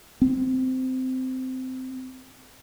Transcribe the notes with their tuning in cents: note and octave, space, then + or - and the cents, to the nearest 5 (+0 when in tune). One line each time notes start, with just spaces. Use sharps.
C4 -15